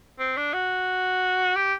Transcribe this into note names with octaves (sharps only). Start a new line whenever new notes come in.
C4
D4
F#4
G4